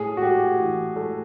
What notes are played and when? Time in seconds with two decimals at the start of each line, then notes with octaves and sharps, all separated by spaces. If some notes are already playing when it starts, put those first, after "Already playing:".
Already playing: A2 G#4
0.17 F#4
0.22 A3 G4
0.59 E3
0.96 A3